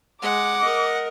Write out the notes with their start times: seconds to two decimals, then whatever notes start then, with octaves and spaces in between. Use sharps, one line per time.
0.22 G#3 F#5 D6
0.61 A#4 D#5